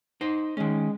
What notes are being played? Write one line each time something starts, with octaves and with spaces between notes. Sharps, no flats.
D#4 C5
D#3 G#3 C#4